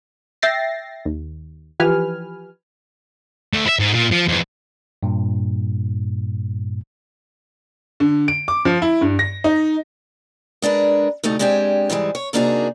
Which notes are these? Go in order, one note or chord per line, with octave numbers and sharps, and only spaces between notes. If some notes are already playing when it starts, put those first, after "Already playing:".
E5 G5 A6 A#6 C7
D#2
E3 F3 G4 B4 G#5 F6
D3 A3
E4 E5
G#2
A#2
F3
F2 E3
G2 A#2
D3
D7
D6
F3
E4
G2
A#6
D#4
G#3 D4 A#4 B4
D2 C3 A3 D#4
G#3 C4 D4 G4 G#5
G#2 E3 G3 G#3
C#5
C3 A#3 D4 D#4 F#4 G#4